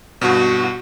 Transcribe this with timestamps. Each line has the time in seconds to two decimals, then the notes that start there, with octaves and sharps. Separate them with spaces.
0.21 G2 B2 F#4